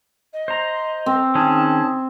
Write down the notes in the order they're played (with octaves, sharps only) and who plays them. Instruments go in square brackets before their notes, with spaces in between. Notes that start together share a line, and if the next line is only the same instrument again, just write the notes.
[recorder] D#5
[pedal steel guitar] C5 A#5
[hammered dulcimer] C4
[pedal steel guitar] D#3 C#4 G#4 [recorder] A5